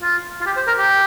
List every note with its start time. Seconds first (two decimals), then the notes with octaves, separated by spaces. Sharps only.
0.03 F4
0.41 F4
0.46 G4
0.56 C5
0.67 A#4
0.78 G4